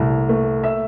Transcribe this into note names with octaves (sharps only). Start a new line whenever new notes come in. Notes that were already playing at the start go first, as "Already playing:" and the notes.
Already playing: C2 A3
A3
E5